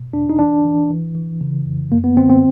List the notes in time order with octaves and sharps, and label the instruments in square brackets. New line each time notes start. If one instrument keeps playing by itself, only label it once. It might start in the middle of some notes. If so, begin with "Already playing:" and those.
Already playing: [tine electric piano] B2
E2 D4
D#4
E3 D4
E3
E3
E3
C#3
F2
F#2 A#3
B3
D3 C4
C4